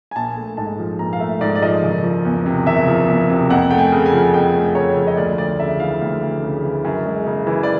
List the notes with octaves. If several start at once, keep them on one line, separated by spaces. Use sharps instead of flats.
G#5
A#1 A5
A3
G#2 A5
F3
A#1 A#5
F5
A3 E5
G#2 D5
D5
F3 D#5
F#1
F3
E2
C3
F#1 E5
F3
E2
C3
F2 F#5
A3 G5
G#5
C#3
G#5
F3
F2 G5
A3
C#3 C#5
F3
D#5
D2 D5
D2 D5
C#3 E5
E3 F5
D2 F5
D2
C#3
E3
F#2
G#3
C#3
E3
D5